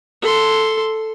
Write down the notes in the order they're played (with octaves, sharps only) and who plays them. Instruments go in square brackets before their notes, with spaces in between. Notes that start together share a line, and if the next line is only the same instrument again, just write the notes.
[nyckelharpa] A4 C6